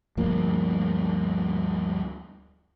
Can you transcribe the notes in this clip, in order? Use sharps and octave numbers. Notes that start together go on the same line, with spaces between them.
D2 G2 F3 A#3